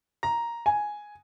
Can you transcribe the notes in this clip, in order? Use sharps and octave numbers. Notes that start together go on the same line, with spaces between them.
A#5
G#5